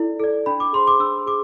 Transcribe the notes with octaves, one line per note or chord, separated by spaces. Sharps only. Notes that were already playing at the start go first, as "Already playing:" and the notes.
Already playing: E4 A4 D5
A4 D5
D4 B5
D6
G#4 C5 C6
D6
D4 E6
G#4 D6